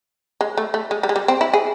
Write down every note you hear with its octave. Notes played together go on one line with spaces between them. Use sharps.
G#3
A3
A3
G#3
G3
G#3
G3
C4
E4
G#4